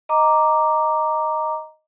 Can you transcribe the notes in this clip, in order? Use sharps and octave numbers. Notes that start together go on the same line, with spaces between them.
D#5 A#5 D6